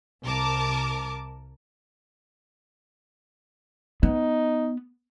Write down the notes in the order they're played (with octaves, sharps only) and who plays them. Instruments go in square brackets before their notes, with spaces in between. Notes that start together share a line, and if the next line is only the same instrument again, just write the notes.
[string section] C2 A#4 A5 D6
[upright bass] B3 [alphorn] D#4